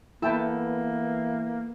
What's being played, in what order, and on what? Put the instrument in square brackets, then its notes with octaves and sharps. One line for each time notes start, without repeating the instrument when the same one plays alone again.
[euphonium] E3 [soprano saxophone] A#3 [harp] B3 A4 [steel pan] E4 G5 A5